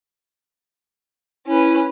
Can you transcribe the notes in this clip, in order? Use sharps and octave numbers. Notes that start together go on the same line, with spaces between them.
C#4 E4 B4